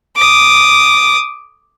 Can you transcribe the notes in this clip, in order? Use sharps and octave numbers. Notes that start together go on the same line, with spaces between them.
D6 D#6